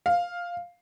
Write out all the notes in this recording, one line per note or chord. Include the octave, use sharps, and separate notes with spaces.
F5